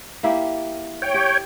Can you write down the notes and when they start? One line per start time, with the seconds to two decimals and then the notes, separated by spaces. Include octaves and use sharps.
0.23 A#3 E4 G4
1.02 C#5 G5
1.14 G4